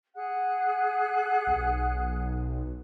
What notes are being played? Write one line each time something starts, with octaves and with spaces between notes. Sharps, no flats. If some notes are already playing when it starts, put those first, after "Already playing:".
G#4 F#5 F#6
B1